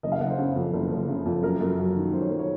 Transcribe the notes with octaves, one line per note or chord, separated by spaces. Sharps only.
F#1 D#5
F5
F#1 F#5
C5
C#3
F2
F#1
F#1
C#3
F2
F#2 A#4
F#2
F#3
D#3
F#2 C5
C#5
F#2 A#4
C#5